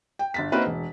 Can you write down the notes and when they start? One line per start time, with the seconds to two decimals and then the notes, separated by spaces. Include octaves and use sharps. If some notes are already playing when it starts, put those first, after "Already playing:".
0.19 G5
0.34 G1 A6 B6
0.52 A#3 C4 D#4 F#4 B4 E5
0.66 E1